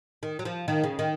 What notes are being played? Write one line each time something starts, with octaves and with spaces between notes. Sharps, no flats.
D#3
F#3
F3
D#3
C#3
D#3